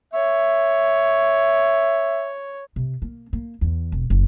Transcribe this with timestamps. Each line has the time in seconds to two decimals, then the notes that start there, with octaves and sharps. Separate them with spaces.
0.14 C#5 E5
2.76 C3
3.02 A#3
3.33 A#3
3.61 E2
3.92 E1
4.10 F#1